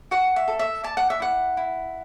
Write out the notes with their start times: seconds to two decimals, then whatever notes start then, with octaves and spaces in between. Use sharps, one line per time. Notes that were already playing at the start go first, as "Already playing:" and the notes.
0.11 F#4 F#5
0.36 E5
0.48 A4
0.59 E5
0.84 D5 A5
0.97 F#5
1.10 E5
1.20 E4 F#5
1.57 E4